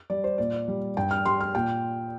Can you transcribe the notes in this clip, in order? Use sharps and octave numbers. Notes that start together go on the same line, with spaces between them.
G3 D5
C5
A#2 D5
G3
G2 G5
F6
G3 C6
F6
A#2 G5